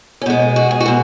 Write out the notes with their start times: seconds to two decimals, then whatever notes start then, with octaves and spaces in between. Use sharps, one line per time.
0.21 C#4
0.26 B2 G#3 B3
0.56 F#4
0.71 G#4
0.81 F#4
0.86 B2 G#3